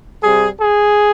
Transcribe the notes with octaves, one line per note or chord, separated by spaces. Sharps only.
C3 G3 G#4
G#4